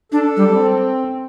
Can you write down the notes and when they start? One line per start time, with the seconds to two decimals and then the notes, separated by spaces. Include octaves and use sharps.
0.12 D4 A4
0.37 G3
0.49 C4